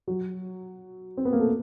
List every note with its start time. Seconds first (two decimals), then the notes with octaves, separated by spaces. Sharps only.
0.07 F#3
1.17 C4
1.25 B3
1.33 A#3
1.40 A3